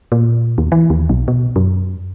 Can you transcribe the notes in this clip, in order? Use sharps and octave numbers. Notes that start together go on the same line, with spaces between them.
A#2
D#2
E3
D#2
B1
B2
F#2